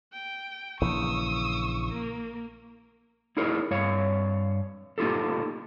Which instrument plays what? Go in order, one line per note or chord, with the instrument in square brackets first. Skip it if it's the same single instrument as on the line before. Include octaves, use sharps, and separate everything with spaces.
[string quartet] G5
[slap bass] A#1 C#3 E3 [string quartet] C#6 D#6 E6
[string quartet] A#3
[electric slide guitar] D#4 E4 G#4 A#4 C#5
G2 C#5 F5
A#3 D#4 F4 G4 A4